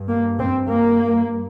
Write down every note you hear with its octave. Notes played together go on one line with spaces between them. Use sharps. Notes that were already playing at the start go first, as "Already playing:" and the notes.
Already playing: G2
A#3
C4
A#3